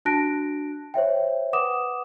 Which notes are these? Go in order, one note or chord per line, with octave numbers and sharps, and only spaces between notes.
D4 F#4 A5 F#6 A#6 D7
C5 C#5 E5 G5
B4 F#5 D6 D#6 E7